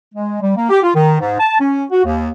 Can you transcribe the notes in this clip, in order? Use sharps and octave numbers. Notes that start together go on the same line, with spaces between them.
G#3
G3
A#3
G4
F4
D#3
G#2
A5
C#4
F#4
D#2